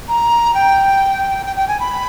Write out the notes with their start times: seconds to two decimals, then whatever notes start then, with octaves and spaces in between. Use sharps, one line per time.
0.08 A#5
0.54 G5
1.46 G5
1.56 G5
1.68 G#5
1.80 B5